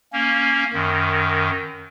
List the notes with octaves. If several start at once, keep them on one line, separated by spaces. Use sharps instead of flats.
A#3 C#4
F#2 D#3